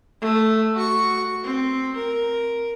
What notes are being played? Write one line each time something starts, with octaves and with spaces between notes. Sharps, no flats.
A3
F#4 C#6
C4
A#4